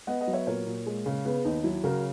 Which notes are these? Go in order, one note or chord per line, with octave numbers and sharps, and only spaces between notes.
B3 D#5 F#5
D#5 F#5
F#3
C#5 E5
A#2 A#4 C#5
A#2
G#3
C#3
B3 G#4 B4
D#2 D#4
F#3 E4
C#3 F#4 A#4